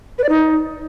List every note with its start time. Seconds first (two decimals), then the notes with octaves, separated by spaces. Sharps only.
0.18 B4
0.24 D5
0.29 D#4